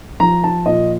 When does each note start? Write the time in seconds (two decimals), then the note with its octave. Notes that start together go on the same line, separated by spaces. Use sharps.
0.20 F3 A#5
0.44 A5
0.66 A#2 D#5